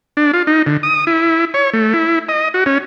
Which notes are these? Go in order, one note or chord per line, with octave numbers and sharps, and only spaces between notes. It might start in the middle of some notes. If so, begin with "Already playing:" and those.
D4
F4
D#4
D3
D#6
E4
C#5
A3
E4
D#5
F#4
C#4